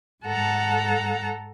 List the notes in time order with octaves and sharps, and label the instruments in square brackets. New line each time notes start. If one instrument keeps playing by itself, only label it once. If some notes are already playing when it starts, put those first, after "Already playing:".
[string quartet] G#2 A4 F#5 A5 A#5 F#6